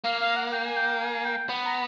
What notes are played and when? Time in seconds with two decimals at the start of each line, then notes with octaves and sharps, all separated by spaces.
0.04 A#3 F5
0.21 F5
0.36 F#5
0.52 G5
0.65 G#5
0.76 G5
1.01 G#5
1.25 G5
1.49 B3
1.65 A#5